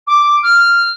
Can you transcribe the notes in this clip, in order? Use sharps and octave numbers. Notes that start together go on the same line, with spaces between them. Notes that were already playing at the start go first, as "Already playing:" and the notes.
D6
F6